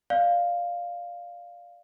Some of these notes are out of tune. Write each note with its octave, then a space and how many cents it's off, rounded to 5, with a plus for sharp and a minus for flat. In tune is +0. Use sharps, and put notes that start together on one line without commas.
D5 +0 F5 +0